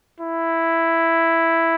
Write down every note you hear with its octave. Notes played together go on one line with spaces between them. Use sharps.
E4